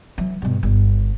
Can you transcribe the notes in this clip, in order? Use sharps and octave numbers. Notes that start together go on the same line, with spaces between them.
E3 F#3
G2 B2
G1